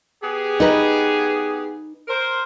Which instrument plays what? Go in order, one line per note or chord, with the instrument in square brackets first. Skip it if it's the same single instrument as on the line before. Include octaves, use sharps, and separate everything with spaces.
[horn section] B3 G4 G#4
[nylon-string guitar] D#4 B4
[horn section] A#4 C5